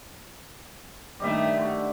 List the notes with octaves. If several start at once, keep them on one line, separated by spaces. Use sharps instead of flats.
G2 D#3 G3 A3 D#5 E5
D3 F#4